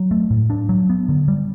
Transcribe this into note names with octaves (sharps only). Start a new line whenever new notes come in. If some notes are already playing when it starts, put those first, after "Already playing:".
Already playing: F#3
A3
A2
D4
F#3
B3
D3
G3